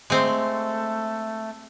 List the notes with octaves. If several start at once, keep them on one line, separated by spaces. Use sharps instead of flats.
G#3 A3 C4